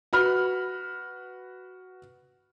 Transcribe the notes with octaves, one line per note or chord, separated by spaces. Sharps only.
F#4 B4 B5 F6